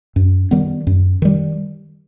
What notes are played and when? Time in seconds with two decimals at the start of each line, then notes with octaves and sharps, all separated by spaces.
0.16 F#2
0.51 D#3 G3 B3
0.87 F#2
1.22 D#3 G3